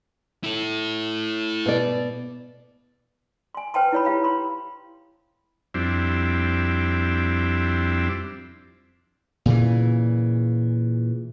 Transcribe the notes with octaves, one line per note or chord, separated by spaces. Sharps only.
E4 A4
B2 D5
G#5 C6
B4 C5 G5 A5 C6
E4 C#5 B5
E4 G4 F5 B5
B5 C6
F2 G3 C4 D4 E4
A#2 C#3 E3